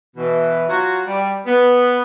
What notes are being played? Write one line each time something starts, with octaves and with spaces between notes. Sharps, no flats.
B2 E3
F#3 F4 F#4
G3
B3